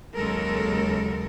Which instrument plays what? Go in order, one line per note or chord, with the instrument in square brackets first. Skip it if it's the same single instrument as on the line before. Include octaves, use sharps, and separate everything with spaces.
[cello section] D#2 C#3 F#3 G#3 A4 A#4